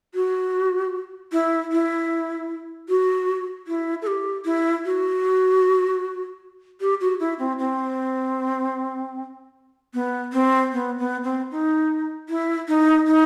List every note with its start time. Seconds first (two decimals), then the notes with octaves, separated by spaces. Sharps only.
0.14 F#4
1.32 E4
1.72 E4
2.89 F#4
3.67 E4
4.02 A4
4.07 G4
4.45 E4
4.85 F#4
6.81 G4
7.01 F#4
7.20 E4
7.39 C4
7.59 C4
9.94 B3
10.33 C4
10.73 B3
10.99 B3
11.24 C4
11.51 D#4
12.29 E4
12.68 D#4
13.07 D#4